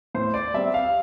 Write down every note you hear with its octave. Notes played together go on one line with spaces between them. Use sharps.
A2 C5
D5
G3 C4 E5
F5